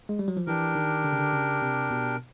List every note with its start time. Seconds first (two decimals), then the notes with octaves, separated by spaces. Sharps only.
0.09 G#3
0.19 G3
0.28 F#3
0.37 F3
0.47 E3 D4 G4 A#4
0.76 D#3
1.04 D3
1.13 C#3
1.19 D3
1.33 C#3
1.62 C3
1.90 B2